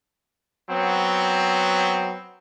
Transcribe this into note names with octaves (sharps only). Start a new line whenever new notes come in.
F#3 B3 C4